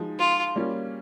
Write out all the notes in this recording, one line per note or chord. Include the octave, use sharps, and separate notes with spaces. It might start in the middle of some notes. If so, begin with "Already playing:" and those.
Already playing: F3 G#3 D#4
F4
G3 A#3 C#4 F4